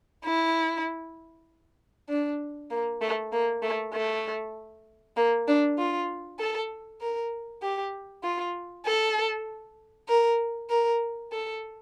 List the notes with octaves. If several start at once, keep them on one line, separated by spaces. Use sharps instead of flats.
E4
D4
A#3
A3
A#3
A3
A3
A#3
D4
F4
A4
A#4
G4
F4
A4
A#4
A#4
A4